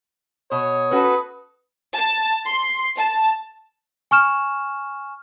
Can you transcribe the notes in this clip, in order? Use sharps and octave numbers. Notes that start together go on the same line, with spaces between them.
B2 C#5 D#6
C#4 F#4 A4 B4
A5
C6
A5
G#5 C#6 F6 E7